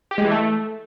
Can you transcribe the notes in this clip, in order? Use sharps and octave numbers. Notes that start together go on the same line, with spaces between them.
G4
G#3
E3
A3